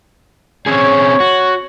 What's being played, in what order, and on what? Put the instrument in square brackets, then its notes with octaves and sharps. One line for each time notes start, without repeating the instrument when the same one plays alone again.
[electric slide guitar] C4 C#4 G#4 [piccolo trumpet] C#5
[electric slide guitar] F#4